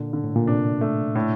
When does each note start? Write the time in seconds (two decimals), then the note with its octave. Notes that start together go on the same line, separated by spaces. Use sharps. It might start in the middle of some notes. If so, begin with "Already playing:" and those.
Already playing: A#2 D3
0.13 D3
0.24 A2
0.36 A#2
0.47 C3 D4
0.81 A3
1.15 A2